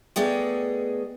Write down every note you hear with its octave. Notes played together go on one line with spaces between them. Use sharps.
A3 B3 G#4 D5 D#5 G5